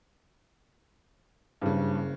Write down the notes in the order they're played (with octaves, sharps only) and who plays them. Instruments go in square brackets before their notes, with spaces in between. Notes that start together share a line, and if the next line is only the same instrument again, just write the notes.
[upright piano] F#1 C#3 [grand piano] G2